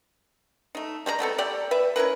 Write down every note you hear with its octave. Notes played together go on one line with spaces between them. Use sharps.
A3 D#4
G3 G#3 B4 A#5
A3 B3 C4 A4
A3 G4 D5
B4 E5
C#4 E4 A#4 B4